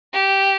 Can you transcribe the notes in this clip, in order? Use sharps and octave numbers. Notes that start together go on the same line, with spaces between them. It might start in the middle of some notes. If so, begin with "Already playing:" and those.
G4